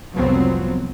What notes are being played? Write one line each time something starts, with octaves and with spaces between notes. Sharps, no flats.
F1 C2 F3 F#3 B3 C4